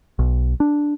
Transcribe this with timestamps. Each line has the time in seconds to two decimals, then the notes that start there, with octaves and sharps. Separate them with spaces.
0.19 B1
0.60 D4